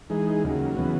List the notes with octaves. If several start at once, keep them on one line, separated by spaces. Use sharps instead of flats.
E3 G#3 D#4 G#4
D#2 C#3 F#3
C#3 E3 B3 F#4